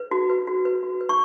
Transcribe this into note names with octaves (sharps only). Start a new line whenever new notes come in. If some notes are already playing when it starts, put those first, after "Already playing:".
Already playing: B4
F#4
B4
F#4
B4
F#4
B4
C#6